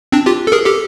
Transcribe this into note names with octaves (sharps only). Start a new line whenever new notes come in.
C4 D4
F4 G4
A4
G#4 A#4
G4 A4